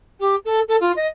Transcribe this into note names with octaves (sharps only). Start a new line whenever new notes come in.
G4
A4
A4
F4
D#5